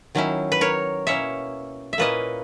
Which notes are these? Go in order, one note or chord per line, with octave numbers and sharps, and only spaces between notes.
D#3 F#3 C#4 E4
B4
A#4 C#5
B2 A#3 C#4 E4 C#5 E5
E5
A#2 A#3 C#4 E4 B4 D#5